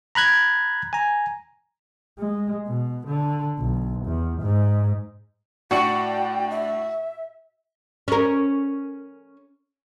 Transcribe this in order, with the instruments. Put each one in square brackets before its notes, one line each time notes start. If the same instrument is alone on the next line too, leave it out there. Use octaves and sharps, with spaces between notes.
[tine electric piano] A#5 B5 F#6 G#6
G#5 A#5
[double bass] G#3
B2
D3
B1
E2
G#2
[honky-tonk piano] A2 D4 C#7 [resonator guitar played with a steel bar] F#4 [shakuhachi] G5
[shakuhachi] E5
[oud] C#4 A#4